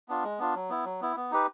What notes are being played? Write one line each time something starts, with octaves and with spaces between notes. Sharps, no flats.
B3 D4 F4
G#3
B3 D4 F4
F#3
B3 E4
F#3
B3 E4
B3
D#4 G4 B4